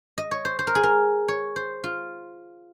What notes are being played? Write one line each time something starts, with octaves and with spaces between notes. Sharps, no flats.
D#5
C#5
C5
C5
A#4
G#4
A#4
C#5
C5
F4